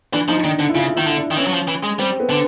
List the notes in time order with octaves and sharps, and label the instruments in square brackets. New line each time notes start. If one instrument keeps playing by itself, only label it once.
[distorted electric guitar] E3 [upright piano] D4
[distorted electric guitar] F3 [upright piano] D#4
[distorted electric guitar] D#3 [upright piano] D4
[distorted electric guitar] D3
[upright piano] E4
[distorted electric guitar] C#3 [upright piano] F4
[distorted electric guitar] D#3 [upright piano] E4
[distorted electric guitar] D3
[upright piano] D4
[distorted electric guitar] D#3
[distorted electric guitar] E3 [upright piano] C#4
[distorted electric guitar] F#3
F3
E3
G#3
[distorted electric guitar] G3 [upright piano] C4
[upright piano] B3
[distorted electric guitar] D3